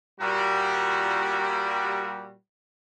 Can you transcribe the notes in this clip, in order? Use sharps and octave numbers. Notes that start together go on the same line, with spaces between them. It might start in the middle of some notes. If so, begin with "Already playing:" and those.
A#2 G3 F#4